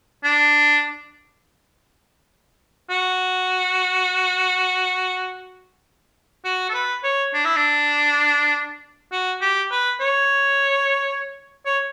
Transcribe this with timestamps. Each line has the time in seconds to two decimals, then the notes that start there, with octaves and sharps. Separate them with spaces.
0.24 D4
2.90 F#4
6.45 F#4
6.69 A4
6.74 B4
7.04 C#5
7.34 D4
7.45 E4
7.56 D4
9.12 F#4
9.41 G4
9.71 B4
10.01 C#5
11.66 C#5